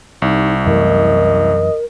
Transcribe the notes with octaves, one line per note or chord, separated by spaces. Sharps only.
C2 D#4
F#2 E3 A3 A#4 D#5